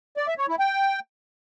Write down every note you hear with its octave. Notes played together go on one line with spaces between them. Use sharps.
D5
E5
C#5
E4
G5